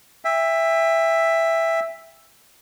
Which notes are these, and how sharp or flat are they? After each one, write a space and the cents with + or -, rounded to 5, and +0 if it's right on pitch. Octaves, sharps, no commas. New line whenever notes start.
E5 +5 G5 +40